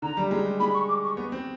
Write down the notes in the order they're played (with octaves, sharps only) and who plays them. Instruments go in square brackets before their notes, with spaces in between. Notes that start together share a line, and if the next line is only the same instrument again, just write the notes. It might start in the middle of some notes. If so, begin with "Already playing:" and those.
[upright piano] D3 [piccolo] A#5
[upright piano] G3
G#3
G3
[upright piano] G#3 [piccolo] B5
[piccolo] C#6
D6
C#6
[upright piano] B3
C4